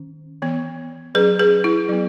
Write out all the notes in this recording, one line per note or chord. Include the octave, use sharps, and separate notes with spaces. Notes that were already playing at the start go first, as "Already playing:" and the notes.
Already playing: D#3 C#4
E3 B3
F#3 C#4 G#4 B4
G#4 B4
E4
F#3 B3